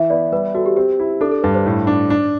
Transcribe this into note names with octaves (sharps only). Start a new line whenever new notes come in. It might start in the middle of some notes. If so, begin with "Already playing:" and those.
Already playing: E3 E5
B3 D5
G3 B4
F#4 A4
G4
C4 G4
E4
D4 A4
A4
G2 B4
C5
A2
D4
D4